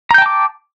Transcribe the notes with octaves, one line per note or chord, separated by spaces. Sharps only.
G5 A5 A#5 D6 G6